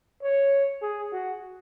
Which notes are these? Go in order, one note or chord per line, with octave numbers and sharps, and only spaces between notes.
C#5
G#4
F#4